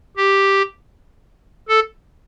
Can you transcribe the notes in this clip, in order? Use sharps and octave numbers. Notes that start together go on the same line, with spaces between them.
G4
A4